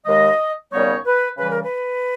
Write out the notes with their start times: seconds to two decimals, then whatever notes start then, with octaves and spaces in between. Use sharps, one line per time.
0.05 D#2 D#3 G#3 D#5
0.71 D#2 C#3 G3 B3 D#4 C#5
1.05 B4
1.37 C#3 E3 G3 B4
1.50 A#4
1.63 B4